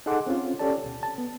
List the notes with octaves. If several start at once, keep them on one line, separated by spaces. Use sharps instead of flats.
D#4 G#4 A4 F#5 C6 D6
C4 C#4 F4
C#4 G4 A4 D5 A5
D2 B2
A5
B3